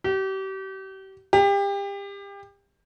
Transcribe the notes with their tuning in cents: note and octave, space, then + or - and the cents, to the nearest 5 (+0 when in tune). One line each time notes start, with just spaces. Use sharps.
G4 -35
G4 +30